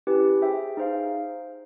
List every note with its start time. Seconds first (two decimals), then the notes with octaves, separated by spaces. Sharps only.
0.07 C#4 E4 G4 B4
0.42 G#4 C5 E5 G5
0.77 D#4 G#4 C5 F5